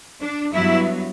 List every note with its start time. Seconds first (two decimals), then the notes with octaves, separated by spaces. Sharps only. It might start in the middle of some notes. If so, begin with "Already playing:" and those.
0.21 D4
0.53 G2 F#3 B3 E4